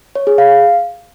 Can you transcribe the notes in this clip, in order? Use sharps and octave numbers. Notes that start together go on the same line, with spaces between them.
C#5
G#4
F5